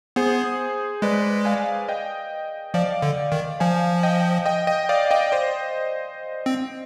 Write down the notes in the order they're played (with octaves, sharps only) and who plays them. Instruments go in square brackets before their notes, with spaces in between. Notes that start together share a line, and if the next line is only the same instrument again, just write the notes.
[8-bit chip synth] B3 [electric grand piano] G#4 C5
[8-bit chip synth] G#3 [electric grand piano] B4 D5
[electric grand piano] F5 G#5
D#5 G5
[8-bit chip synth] F3 [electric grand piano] D5 F5
[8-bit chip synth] D3
D#3
[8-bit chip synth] F3 [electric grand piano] F5 G#5
[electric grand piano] D#5 G5
D#5 G5
D#5 G5
D5 F5
D#5 G5
C5 D#5
[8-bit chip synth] C4